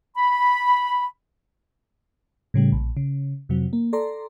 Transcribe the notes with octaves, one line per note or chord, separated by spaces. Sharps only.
B5
A2 C#3 G3
A#1
C#3
F2 C3 F#3
A#3
A4 D5 A#5 C6